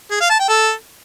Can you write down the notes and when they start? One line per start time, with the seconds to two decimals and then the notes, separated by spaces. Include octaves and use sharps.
0.11 G#4
0.21 F5
0.30 A5
0.40 G5
0.49 A4